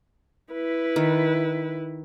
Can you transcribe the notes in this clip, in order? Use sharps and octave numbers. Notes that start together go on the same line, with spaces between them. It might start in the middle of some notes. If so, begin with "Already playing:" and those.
E4 B4
D#3